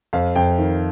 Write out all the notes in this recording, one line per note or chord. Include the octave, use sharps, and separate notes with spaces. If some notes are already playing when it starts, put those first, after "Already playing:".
F2 F5
F2 G5
D#3